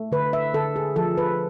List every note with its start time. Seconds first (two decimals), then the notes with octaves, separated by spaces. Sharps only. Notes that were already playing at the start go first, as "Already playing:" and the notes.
Already playing: A3
0.12 D3 B4
0.33 E5
0.54 D3 A4
0.76 G#4
0.96 F3 A4
1.18 B4